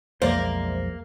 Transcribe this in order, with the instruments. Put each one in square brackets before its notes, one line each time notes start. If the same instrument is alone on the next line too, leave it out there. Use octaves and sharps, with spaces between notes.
[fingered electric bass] B1 F2 G#3 [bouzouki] A#3 [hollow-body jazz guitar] C5 D5 E5